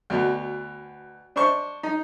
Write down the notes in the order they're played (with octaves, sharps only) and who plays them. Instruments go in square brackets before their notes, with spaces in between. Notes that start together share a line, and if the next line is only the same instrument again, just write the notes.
[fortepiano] D2 B2
D4 C5 C#6
D#4